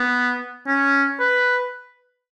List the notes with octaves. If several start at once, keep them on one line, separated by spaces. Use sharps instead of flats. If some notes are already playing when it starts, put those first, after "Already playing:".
Already playing: B3
C#4
B4